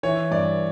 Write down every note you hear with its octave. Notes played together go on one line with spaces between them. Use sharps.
E3 C#5
G2 D5